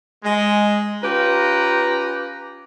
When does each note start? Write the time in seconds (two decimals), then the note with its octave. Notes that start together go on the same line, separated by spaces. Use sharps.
0.24 G#3
1.02 C#4 F4 G4 B4 A#5